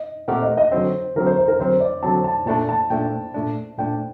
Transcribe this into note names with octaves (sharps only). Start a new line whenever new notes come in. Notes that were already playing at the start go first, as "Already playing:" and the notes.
Already playing: D#5
A#2 A3 C4 G4 A#4 F#5
D#5
D#5
D3 F#3 C4 C5
D3 F#3 C4 A#4
C5
C5
A#4
D3 F#3 C4 C5
D5
D3 F#3 C4 A5
A5
A#2 A3 D4 A5
A5
A#2 A3 D4 G5
A#2 A3 D4
A#2 A3 D4 G5